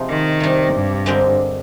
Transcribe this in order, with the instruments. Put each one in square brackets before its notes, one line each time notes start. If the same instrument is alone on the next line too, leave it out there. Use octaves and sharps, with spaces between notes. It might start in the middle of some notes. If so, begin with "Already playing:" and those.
Already playing: [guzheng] C3 F3 G#3 D#4
[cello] D#3
[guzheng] C3 G3 D4
[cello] G2
[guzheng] D3 G#3 C4 G4 A#4